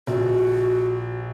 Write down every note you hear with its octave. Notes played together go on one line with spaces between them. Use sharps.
A#1 F#4